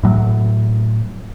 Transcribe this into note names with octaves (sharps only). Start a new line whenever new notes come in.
A2 F#3